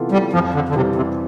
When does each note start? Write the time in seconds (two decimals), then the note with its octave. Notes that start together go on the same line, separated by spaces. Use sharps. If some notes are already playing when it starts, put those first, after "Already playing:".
Already playing: C3 E3 B3 F4 A4
0.12 G3
0.33 F2 F3
0.54 D3
0.69 D3
0.75 C3 E3 G3 C4 G4
0.95 C3